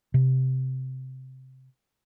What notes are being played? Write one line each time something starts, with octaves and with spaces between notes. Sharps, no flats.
C3